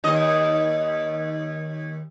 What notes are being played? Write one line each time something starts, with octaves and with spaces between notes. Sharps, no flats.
D#2 D#5